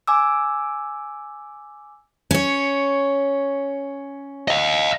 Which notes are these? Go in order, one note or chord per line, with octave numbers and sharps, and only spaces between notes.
G#5 D6 E6
C#4 C#5
D#5 F5